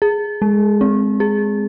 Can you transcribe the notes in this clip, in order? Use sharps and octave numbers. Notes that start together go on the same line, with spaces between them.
G#4
G#3
C4
G#4